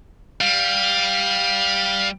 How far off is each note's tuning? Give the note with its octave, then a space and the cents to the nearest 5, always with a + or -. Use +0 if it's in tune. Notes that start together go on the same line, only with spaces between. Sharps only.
G3 +0 F5 +15